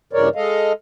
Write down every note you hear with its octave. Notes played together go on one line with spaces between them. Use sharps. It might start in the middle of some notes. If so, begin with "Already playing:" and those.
G2 C#3 E3 A#4 C#5 D5
G#3 A4 D#5 F5